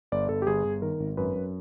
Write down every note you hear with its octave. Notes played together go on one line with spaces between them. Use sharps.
G1 D5
G1 A4
G4
G1 G#4
G1
D#3 A#4
G#1
F#2 B4
F#2